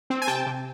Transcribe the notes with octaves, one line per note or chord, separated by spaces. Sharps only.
C4
G#5
C3 G5 A5
C3